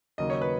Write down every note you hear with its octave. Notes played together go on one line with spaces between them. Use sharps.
D#2 C#3 F#3 A#3 D#5
C#5
B4